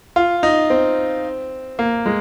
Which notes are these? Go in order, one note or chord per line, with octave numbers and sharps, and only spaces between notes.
F4
D#4
C4
A#3
G#3